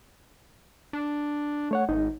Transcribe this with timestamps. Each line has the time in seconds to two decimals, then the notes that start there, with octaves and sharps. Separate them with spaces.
0.93 D4
1.71 A3 C#5 F#5
1.89 G#1 D#4